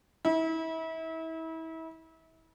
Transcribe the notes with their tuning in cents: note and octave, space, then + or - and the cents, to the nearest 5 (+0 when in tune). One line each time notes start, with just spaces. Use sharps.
E4 -35